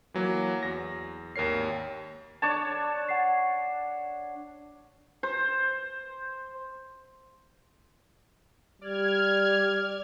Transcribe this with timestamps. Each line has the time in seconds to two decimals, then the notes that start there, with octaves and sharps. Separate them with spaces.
0.14 E3 F#3 A#3
0.63 E2 A#6
1.36 G#1 D#2 A#4 C#5 C7
2.42 D4 C#5 A5
3.09 F#5 C7
5.23 C5
8.81 G3 D5 F6 G#6